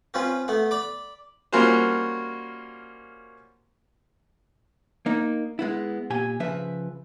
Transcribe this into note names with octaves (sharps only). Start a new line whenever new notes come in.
C4 C#4 F4 B4
A3 B3 F#5
D5 B5 D6
G3 A#3 C#4 F4 F#4 C5
A#3 D#4
G#3 B3 E4
A#2 G4 G#5
C#3 F3 B4 E5